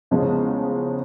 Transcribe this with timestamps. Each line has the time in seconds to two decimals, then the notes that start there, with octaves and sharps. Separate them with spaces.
0.11 E2 C#3 F3 G#3 C#4